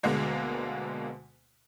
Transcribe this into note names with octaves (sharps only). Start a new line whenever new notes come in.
D2 B2 D3 G#3 A#3